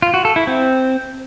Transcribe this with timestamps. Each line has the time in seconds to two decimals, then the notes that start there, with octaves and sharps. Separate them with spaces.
0.02 F4
0.14 F#4
0.25 A4
0.36 E4
0.47 C4